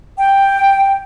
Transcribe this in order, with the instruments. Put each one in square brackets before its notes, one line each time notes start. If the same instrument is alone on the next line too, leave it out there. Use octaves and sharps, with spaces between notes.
[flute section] G5